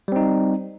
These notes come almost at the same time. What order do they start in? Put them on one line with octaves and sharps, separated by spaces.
G3 C4 D#4